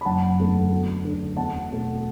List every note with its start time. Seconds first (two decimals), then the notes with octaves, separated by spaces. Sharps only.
0.01 B5
0.05 F#1 F#5 A5
0.39 E2 D3 A3
0.71 D2
1.04 D3 A3
1.37 E2 F#5 A5
1.71 B2 A3